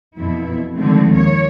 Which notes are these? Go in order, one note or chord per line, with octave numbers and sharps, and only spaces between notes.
F2 B2 F3 E4
D3 D#3 F3 G#3 A3 C4
D#2 A#3 C#5